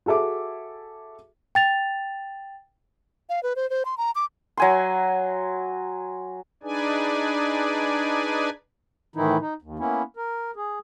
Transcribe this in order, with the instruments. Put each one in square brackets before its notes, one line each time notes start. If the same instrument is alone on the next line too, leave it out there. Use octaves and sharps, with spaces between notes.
[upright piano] F#4 G#4 A4 E5 D6
[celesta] G5 A6 F7
[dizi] F5
B4
C5
C5
C6
A#5
D6
[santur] F#3 G#5 C6
[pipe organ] D4 D#4 G#4 B4 D5 G#5
[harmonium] A2 D#3 E3 D#4 E4
D#4
D#2
A#3 B3 C#4 E4
A#4
G#4